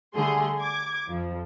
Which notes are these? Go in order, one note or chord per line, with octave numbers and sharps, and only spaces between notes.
D3 G3 A3 G#4 C6
D6 G#6
F2 F3